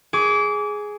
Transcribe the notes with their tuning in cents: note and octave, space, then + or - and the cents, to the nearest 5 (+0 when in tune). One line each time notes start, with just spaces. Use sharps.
G#4 +5 D6 -30